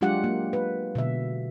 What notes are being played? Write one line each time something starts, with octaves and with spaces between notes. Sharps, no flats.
F#3 G#3 D4 F4 G4 F#5
A#3
B4
B2 D3 E5